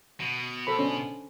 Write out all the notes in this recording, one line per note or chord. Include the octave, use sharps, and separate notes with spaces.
B2
A4 C5 B5
C#4 D4